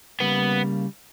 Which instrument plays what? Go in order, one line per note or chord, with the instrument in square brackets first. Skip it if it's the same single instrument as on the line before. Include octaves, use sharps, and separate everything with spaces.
[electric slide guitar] C#3 G3 A#3 [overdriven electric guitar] B3